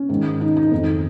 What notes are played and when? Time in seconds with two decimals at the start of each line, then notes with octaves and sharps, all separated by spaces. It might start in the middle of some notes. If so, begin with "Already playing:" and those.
Already playing: C#4
0.09 G#2 D#3
0.41 D#4
0.57 D#4
0.72 F2 D#3